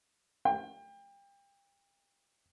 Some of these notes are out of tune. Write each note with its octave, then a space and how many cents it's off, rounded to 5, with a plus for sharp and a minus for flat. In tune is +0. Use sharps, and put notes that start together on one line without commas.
G5 +30